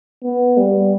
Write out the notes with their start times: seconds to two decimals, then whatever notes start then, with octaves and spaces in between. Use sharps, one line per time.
0.24 B3
0.57 G3